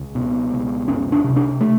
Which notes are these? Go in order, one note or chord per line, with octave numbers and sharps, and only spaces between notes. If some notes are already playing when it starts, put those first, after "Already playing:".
Already playing: C#2
B2
C#2
F#1 C#4
D4
C3
D4
A3